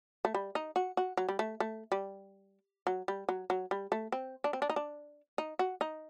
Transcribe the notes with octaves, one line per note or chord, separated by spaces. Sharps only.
A3
G3
D#4
F#4
F#4
F#3
G3
A3
A3
G3
F#3
G3
F#3
F#3
G3
A3
C4
D4
C4
D4
D#4
D4
D#4
F#4
D#4